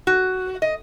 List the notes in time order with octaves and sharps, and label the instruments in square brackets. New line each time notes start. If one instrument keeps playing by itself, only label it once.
[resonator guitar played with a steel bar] F#4
D#5